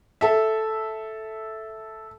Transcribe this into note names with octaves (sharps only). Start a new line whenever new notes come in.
A4 E5